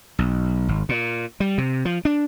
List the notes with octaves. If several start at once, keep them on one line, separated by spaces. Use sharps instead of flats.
B1
G#1
A#2
G3
C3
F3
D4